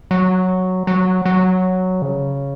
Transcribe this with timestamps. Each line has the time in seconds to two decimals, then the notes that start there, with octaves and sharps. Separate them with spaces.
0.11 F#3
0.87 F#3
1.25 F#3
2.02 C#3